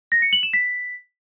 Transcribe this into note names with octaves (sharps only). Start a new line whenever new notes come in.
A#6
C#7
F#7
E7
B6